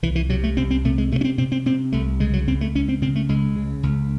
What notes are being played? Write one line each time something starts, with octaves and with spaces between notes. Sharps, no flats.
C2 E3
E3
C3 F#3
A3
C2 C4
C4
C3 A3
G#3
C3 A3
C#4
C4
C3 C4
C4
C3 C4
C2 A3
C#3 G#3
F#3
C#2 C4
A3
C#2 C#4
C4
C#3 C4
A3
C#2 G#3
C#3
C#2